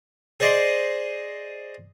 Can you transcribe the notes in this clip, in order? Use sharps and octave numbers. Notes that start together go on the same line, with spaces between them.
G#4 C5 D5 D#5